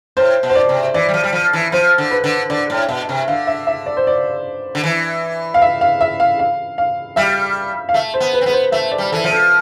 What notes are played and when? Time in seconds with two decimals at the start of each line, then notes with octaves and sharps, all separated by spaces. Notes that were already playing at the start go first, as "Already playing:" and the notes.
0.17 A2 C5
0.43 B2
0.50 C5
0.56 D5
0.69 C3
0.94 E3 D5
1.09 G3
1.14 F3
1.24 G3
1.33 F3
1.53 E3
1.72 F3 C5
1.98 D3
2.11 B4
2.24 D3
2.50 D3 D5
2.70 A2
2.89 B2 E5
3.09 C3
3.28 D3 F5
3.47 E5
3.67 E5
3.86 D5
3.97 C5
4.07 D5
4.75 D3
4.84 E3
5.54 F5
5.62 E5
5.81 F5
6.01 E5
6.20 F5
6.39 F5
6.78 F5
7.16 G3 E5
7.89 F5
7.94 A3 E5
8.14 C5
8.20 B3
8.33 B4
8.41 C4
8.46 B3 B4
8.53 C5
8.72 A3 E5
8.92 D5
8.98 G3
9.12 E3 A4
9.24 F3
9.31 A4